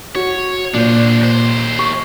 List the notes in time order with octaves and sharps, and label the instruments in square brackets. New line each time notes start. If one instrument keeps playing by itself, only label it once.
[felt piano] F#4 [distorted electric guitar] C#5
[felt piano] A#2 [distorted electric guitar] D4 C5
[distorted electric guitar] D#2 C5
[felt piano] C#6